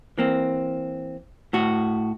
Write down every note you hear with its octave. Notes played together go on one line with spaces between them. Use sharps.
E3 A#3 C4
A2 F#4